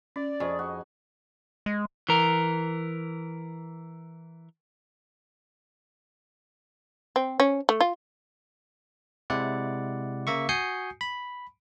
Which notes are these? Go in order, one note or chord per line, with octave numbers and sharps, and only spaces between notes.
C#4 D5
F2 G#4 D#5 C#6
F#4
G#3
E3 A#4
C4
C#4
A3
F4
C3 G#3 E4 D5 F#5
C#3 A#3 E5 C#6
F#4 G#5 D#6 G6 C7 C#7
B5